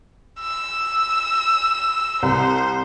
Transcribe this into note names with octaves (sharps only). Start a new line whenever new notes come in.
E6
C2 C5